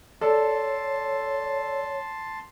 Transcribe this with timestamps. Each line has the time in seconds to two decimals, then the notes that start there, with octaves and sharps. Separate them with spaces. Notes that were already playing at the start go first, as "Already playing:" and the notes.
0.21 A4 C#5 D5 A5 C6